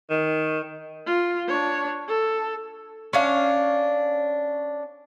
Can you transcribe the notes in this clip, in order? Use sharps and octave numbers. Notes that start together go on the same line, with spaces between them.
D#3
F4
D4 C#5
A4
C#4 D4 F5